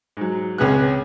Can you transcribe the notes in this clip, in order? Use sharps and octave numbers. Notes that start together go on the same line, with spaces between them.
G#2 F#3
C#2 C3 C#4 G#4 B4 F#6